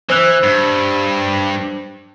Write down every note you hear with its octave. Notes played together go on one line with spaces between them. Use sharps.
E3 C5 E6 F#6
G2